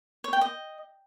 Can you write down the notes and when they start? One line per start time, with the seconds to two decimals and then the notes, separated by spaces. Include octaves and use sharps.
0.24 C#5
0.33 G5
0.41 D#5